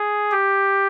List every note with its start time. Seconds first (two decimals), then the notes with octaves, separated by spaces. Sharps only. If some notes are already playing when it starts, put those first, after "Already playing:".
Already playing: G#4
0.31 G4